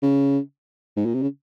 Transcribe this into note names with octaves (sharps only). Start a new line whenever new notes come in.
C#3
G#2
A#2
C3
C#3